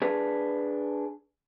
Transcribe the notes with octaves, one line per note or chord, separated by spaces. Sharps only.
D4 G#4 B4